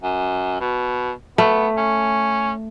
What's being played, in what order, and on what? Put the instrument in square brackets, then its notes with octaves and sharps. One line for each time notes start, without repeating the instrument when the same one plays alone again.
[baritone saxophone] F#2
B2
[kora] A3 [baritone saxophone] B3
[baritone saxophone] C#4